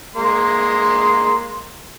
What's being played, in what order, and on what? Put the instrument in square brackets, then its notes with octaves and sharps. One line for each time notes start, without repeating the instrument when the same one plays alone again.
[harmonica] G#3 A#3 C6